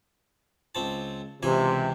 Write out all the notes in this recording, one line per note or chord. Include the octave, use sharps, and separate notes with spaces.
C#2 C4 A5
C#2 C3 E3 G#5